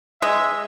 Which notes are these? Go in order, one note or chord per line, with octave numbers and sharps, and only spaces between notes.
G#3 E5